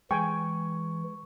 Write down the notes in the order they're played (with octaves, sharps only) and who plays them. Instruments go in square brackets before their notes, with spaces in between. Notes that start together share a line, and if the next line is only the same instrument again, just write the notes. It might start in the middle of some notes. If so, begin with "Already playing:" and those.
[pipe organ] E3 [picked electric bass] G#3 [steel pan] G5 G#5 [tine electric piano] C#6